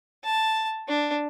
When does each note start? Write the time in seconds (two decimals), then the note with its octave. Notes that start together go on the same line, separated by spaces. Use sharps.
0.24 A5
0.88 D4